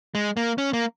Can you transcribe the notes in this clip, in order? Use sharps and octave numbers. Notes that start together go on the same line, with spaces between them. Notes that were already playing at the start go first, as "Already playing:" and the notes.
G#3
A#3
C#4
A#3